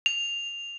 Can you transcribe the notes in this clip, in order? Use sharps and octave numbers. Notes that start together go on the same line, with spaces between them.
F7